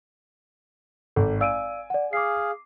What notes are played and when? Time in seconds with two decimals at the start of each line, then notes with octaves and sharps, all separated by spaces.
1.16 G#1 A4
1.41 D5 F5 G#5 E6 D7 D#7
1.90 D5 F#5
2.13 G#4 F5 D6 C7